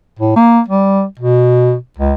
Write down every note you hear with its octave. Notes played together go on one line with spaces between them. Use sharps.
A2
A#3
G3
B2
C#2